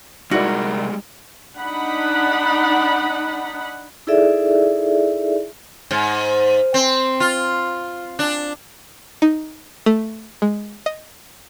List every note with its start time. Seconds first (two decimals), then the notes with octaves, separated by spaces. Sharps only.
0.31 C3 G3 G#3 D#4 E4 F#4 A#4 D5
1.57 D4 D#4 F#5 B5
4.07 D#4 E4 G#4 A4 D5 E5
5.91 G#2
6.74 C4
7.20 F4
8.19 D4
9.22 D#4
9.86 A3
10.42 G#3
10.86 D#5